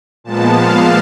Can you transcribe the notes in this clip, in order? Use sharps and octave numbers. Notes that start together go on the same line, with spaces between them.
A#2 F3 G#3 B3 A5
F5